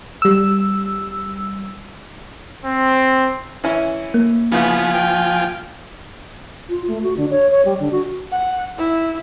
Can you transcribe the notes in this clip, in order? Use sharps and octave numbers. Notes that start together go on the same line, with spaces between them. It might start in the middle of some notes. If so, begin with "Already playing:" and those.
G3 E6
C4
E3 C#4 E4
A#3
C#3 E3 F3 B3 F4 G#5
G5
F4
A3
F#4
D3
C#5
C#5
G3
D3
F#4
F#5
E4